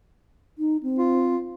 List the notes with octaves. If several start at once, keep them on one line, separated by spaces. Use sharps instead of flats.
D#4
C4
F4